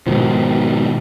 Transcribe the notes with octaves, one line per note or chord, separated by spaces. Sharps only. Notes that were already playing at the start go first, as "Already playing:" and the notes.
G#2 B2 D#3 F3